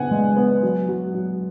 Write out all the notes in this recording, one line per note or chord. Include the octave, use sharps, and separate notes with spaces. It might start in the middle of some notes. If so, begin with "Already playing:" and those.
Already playing: C#3 B3 F#5 G#5
G#3
B3
F#3
F#3
F#3